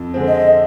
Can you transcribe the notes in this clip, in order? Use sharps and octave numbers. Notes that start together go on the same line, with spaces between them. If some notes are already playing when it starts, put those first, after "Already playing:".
Already playing: F2
D3 G#3 C4
D#5